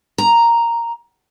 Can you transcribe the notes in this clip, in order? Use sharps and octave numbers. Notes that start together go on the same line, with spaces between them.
A#5